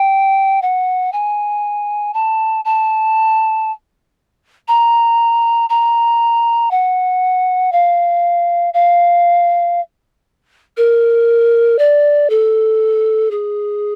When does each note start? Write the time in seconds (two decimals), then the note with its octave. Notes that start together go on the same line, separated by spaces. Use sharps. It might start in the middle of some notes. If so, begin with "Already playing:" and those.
Already playing: G5
0.62 F#5
1.13 G#5
2.14 A5
2.65 A5
4.68 A#5
5.70 A#5
6.71 F#5
7.72 F5
8.74 F5
10.77 A#4
11.79 D5
12.30 A4
13.31 G#4